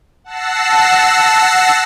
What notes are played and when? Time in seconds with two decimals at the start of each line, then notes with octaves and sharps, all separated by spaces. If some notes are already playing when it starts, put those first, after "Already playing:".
0.24 F#5 A5 E6 A#6 C7